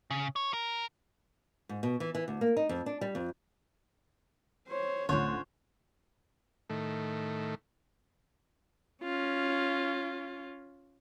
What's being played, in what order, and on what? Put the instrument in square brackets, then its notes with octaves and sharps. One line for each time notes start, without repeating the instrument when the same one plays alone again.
[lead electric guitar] C#3
C#5
A#4
[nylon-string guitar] G#2
B2
E3
E3
D2
A#3
D#4
F2
D4
G3
F2
[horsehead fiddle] C5 C#5
[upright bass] D1 A3 [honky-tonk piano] D3 [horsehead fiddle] C#4 F4 [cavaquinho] C5 C#5
[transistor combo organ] A2 D#3 A3
[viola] C#4 F4